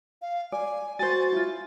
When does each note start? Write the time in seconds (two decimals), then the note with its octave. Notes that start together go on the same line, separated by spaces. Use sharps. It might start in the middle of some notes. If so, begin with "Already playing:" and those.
0.22 F5
0.52 D5 G#5
0.99 F#4 C5 G#5 A6
1.32 E4 F4